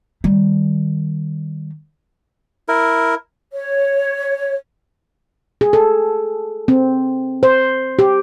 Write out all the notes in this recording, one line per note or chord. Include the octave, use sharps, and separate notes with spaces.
D#3 G3
E4 A#4
C#5
G#4
A4
C4
C5
G4